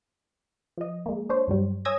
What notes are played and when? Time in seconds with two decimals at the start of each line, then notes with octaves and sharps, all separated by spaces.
0.77 F3 D#5
1.06 G#3 A#3
1.29 D4 C5 C#5
1.47 G2 F#3 G3
1.85 C#5 G#5 D#6 E6 G#6 A#6